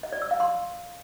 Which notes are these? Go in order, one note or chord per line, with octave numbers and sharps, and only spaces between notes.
D#5
D5
E6
F5
C6